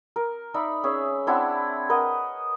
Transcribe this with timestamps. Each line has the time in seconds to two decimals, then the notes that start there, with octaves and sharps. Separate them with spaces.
0.16 A#4
0.54 D#4 D5 E5 B5
0.84 C#4 G#4 E5
1.27 C4 D4 E4 F#5
1.89 A#4 B4 D#5 F#5